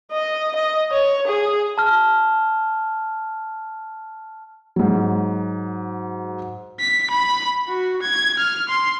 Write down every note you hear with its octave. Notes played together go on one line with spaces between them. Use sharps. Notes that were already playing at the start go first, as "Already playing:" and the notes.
D#5
D#5
C#5
G#4
A5 F6
G#2 F#3
B6
B5
F#4
G#6
F6
C6